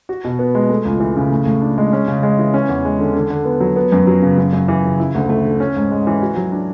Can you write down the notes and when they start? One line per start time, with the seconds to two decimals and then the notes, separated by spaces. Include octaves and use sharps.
0.09 F#4
0.24 B2
0.39 B3
0.55 G#3
0.70 A3
0.85 C#2
1.00 E3
1.16 C#3
1.31 A2
1.46 A2
1.62 D4
1.78 G#3
1.93 C#4
2.08 C#3
2.23 G#3
2.39 E3
2.54 C#4
2.69 E2
2.85 G#3
2.99 D3
3.16 D3
3.30 D3
3.45 B3
3.60 F#3
3.76 B3
3.92 F#2
4.07 F#3
4.22 C#3
4.38 F#2
4.53 F#2
4.68 E3
4.84 C#3
5.00 E4
5.14 D2
5.29 A3
5.45 D3
5.60 C#4
5.76 G#2
5.92 G#3
6.07 E3
6.22 F#4
6.36 F#3
6.52 D4